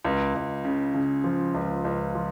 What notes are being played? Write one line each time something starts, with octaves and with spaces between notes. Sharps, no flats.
C#2
C#2
C#3
C#3
F3
C#2
C#2
F3